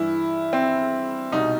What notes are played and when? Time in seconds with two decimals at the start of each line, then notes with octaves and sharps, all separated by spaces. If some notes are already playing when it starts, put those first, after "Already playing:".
Already playing: G2 E3 E4
0.53 C4
1.32 C2 B2 D#4